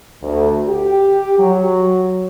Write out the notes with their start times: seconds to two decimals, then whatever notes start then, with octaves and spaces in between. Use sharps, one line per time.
0.22 D2
0.67 G4
1.39 F#3